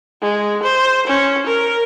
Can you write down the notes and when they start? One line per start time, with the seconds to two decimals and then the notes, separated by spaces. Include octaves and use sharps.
0.22 G#3
0.63 C5
1.07 C#4
1.46 A#4